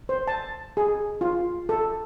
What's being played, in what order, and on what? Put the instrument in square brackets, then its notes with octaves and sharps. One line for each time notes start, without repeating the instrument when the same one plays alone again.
[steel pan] C5
A5
G#4
F4
A4